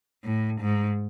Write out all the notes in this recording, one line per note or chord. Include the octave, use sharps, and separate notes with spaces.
A2
G#2